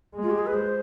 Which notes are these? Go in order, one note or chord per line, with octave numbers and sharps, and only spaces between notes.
G#3
F4
G4
G#4
B4
C5